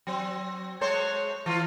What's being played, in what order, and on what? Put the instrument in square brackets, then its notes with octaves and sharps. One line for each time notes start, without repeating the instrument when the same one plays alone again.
[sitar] F#3 C4
G#3 C5 C#5
E3 F4